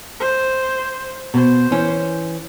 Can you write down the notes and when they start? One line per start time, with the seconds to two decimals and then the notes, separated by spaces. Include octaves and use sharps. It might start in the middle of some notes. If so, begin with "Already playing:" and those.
0.20 C5
1.34 B2 C5
1.71 E3 C#4